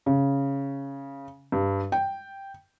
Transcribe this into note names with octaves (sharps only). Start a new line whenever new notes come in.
C#3
G2
G5